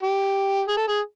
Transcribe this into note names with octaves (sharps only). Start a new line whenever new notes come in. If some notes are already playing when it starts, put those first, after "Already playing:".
G4
G#4
A4
G#4